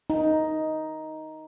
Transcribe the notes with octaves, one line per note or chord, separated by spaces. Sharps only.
D#4